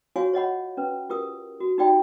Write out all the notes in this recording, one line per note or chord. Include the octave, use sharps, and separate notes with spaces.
F4 F#4 C#5 F5 G#5 C#6
C#5 D#5 F#5 B5
C#4 B4
F4 G4 A#4 D#6
F#4
D#4 F#4 G4 D5 G5 B5